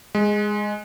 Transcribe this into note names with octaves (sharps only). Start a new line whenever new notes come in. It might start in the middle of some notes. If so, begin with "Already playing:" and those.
G#3